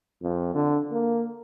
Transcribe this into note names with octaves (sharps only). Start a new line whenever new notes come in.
F2
D3
A#3